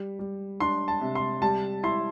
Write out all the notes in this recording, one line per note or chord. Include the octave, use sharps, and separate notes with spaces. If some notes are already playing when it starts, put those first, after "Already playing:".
Already playing: G3
G3
D4 C6
A5
C3
C6
G3 A5
E4 C6